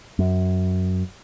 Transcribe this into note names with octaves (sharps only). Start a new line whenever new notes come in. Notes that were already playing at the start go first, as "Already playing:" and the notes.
F#2